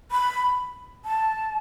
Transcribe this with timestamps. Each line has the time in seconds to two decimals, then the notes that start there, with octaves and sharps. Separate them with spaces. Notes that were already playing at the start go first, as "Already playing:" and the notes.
0.12 B5
1.05 A5